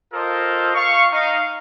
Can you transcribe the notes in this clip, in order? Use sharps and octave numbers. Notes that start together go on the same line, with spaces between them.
F4 A4 A#4 C5 D#5
F5 C#6
D#4 F5